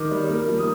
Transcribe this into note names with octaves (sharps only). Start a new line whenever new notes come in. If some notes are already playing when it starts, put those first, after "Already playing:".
Already playing: D#3 D6
G3
A#3
F3
D#6